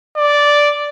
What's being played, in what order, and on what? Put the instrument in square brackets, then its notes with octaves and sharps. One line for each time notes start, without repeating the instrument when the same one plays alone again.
[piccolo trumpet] D5